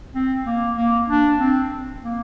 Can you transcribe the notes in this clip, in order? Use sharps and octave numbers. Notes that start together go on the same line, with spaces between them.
C4
A#3
A#3
D4
C4
A#3